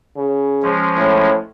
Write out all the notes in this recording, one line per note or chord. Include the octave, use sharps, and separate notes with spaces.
C#3
F3 G#3 C#4
A2